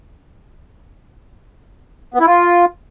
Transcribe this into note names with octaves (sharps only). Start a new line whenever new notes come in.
B3
E4
F4